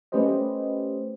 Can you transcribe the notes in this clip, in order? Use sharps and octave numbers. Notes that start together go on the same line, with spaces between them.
A3 C#4 G4 B4 C5 D#5